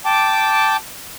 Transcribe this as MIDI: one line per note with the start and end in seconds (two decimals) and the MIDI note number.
0.05 0.77 79
0.05 0.77 81
0.05 0.77 86